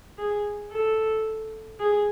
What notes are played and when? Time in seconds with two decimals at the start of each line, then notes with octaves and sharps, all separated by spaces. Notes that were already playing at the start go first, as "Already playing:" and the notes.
0.18 G#4
0.71 A4
1.80 G#4